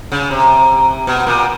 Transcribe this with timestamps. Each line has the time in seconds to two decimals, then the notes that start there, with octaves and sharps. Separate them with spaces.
0.12 C#3
0.31 C3
1.07 B2
1.27 A#2